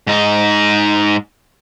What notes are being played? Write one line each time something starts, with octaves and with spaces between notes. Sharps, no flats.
G#2 D#4